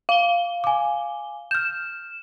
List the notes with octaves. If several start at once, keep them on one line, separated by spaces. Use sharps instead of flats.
F5 G7
G#5 D6
F6 G6 E7